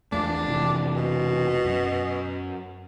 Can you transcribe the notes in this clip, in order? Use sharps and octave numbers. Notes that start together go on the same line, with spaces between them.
E2 F3 A3 D4
F1 C3 E3
B2
F#2